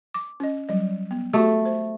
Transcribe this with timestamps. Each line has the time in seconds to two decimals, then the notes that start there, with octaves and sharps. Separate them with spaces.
0.14 D6
0.40 C#4 D#5
0.69 F#3 G3 D#5
1.11 B3
1.33 A3 F#4 G4 A4
1.65 C5